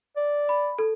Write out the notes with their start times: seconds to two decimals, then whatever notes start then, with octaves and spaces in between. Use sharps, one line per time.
0.17 D5
0.49 B5
0.79 A4